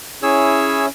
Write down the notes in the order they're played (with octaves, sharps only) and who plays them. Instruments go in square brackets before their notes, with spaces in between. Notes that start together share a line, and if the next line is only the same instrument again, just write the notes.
[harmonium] C#4 E4 [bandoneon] G#4 C#5 E6